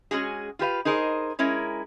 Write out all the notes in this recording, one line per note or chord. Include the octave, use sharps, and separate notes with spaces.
G#3 C#4 F#4 G#4
F4 G4 B4 F5
D#4 G#4 A#4 C5 D#5
G#3 C#4 E4 A#4